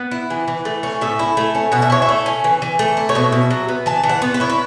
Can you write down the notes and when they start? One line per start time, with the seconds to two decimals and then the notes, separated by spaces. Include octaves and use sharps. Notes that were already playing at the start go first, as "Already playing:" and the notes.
Already playing: B3 F#5
0.11 E4
0.30 E3
0.48 E3
0.65 A3
0.83 C#4
1.01 A2 E5
1.19 E4
1.37 A3
1.55 C#4
1.72 B2 F#5
1.82 E5
1.90 E4 C#5
2.02 E5
2.09 A3
2.26 C#4
2.44 E3
2.62 E3
2.79 A3
2.97 E4
3.09 C#5
3.15 B2 E5
3.32 B2
3.51 F#3
3.69 B3
3.86 E3 A5
4.03 E3
4.09 F#5
4.22 B3
4.34 B4
4.40 E4 C#5
4.50 B4